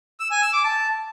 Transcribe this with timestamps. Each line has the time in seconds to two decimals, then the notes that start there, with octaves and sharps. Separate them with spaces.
0.20 E6
0.31 G#5
0.42 E6
0.53 D6
0.64 A5